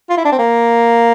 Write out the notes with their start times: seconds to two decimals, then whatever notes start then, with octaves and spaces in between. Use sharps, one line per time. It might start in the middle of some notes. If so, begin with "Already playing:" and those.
0.10 F4
0.17 E4
0.25 D4
0.32 C4
0.39 A#3